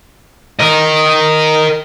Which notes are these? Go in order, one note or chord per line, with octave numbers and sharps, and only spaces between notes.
A#4 D#5